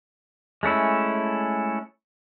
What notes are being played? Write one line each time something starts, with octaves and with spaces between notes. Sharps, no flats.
G#3 A3 C#4 E4